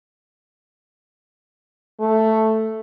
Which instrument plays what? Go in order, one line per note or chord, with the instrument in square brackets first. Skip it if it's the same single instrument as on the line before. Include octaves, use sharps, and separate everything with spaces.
[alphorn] A3